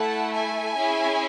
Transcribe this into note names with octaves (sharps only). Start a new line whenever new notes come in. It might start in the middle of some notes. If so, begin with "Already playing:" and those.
Already playing: A3 E4 A4 F#5 A5
E5 G#5
C#4 E4 G#4